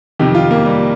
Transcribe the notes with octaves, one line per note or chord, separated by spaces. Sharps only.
F2 C3 D#3 G4
F4
A#3
G3